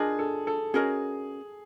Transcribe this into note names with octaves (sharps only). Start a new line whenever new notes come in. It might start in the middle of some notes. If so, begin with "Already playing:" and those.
Already playing: D4 F4 G#4 A#4 D#5
A4
A4
C#4 F#4 G#4 A#4 D#5